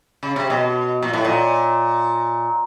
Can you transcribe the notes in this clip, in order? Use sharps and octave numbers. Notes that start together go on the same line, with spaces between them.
C#3
C3
B2
A#2
A2
A#2